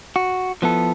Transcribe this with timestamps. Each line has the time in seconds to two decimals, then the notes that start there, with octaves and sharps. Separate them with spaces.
0.16 F#4
0.62 F3 B3 E4 A4